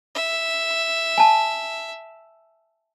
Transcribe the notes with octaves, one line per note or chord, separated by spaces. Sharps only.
E5
G#5 A5